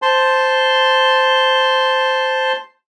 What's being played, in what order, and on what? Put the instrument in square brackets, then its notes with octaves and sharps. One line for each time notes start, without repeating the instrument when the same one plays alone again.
[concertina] C5 A5 C6